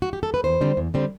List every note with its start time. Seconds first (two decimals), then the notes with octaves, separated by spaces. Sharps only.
0.02 F#4
0.13 G4
0.23 A4
0.34 B4
0.44 E2 C5
0.61 D3 G3 C4
0.77 E2
0.94 D3 G3 C4